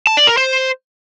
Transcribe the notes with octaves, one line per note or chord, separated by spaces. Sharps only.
A5
D5
A#4
C5